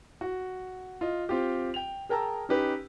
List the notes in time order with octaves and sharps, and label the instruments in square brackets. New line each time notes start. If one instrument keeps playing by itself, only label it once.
[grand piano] F#4
F4 D#5
C4 F4 G4
G5 F7
G#4 A#4 G5 A5 A#5 E6
C#4 D#4 G4 B4